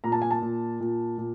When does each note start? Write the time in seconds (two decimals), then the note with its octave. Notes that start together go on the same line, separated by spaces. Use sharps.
0.04 A#2 A#5
0.12 A5
0.22 G#5
0.31 A5
0.42 A#2
0.80 A#2
1.18 A#2